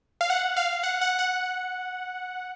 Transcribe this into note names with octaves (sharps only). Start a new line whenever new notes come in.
F5
F#5
F5
F#5
F#5
F#5